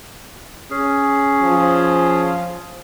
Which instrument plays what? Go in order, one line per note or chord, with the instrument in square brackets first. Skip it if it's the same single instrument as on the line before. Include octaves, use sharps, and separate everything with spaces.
[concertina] C#4 G#4
[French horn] F3